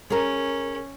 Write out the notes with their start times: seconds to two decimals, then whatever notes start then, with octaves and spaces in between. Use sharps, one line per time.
0.10 C#4 G#4 A#4